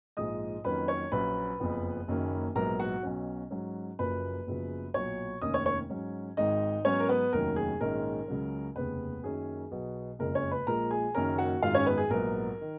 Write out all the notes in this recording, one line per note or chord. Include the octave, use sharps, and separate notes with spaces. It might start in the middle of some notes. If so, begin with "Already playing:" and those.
A#1 G#2 F3 G#3 D#5 D#6
F2 D#3 F#3 A#3 C#4 B4 B5
C#5 C#6
A#1 A#2 F#3 C#4 B4 B5
F#1 F2 F3 B3
F#1 F#2 D#3 A#3 C#4
A#1 G#2 F#3 B3 A#4 A#5
F#4 F#5
B1 B2 F#3 C#4
G#2 F#3 C#4
F#1 F#2 F3 A#3 B4 B5
F#1 F#2 C#3 F3 B3
B1 A#2 F#3 C#5 C#6
F1 D#2 D#3 A#3 C#4 D#5 D#6
C#5 C#6
C#5 C#6
G#2 F#3 C#4
G#1 G#2 D#3 G#3 D#4 D#5
G#2 F#3 B3 C#4 C#5
A#4
B3 B4
F1 D#2 D#3 F#3 C#4 A#4
G#4
A#1 G#2 D#3 G#3 C#4 A#4
C#2 C#3 F#3 C#4
F1 D#2 C#3 B3 B4
F#2 D#3 A#3 C#4 G#4
B1 B2 F#3 B3
F#1 F2 C#3 G#3 A#4
C#4 C#5
B4 B5
A#1 A#2 F3 G#3 A#4 A#5
G#4 G#5
F#1 F#2 D#3 A#3 C#4 A#4 A#5
F#4 F#5
G#1 F#2 D#3 G#3 F4 F5
C#4 C#5
B3 B4
G#4
A#1 G#2 F#3 B3 A#4
D#3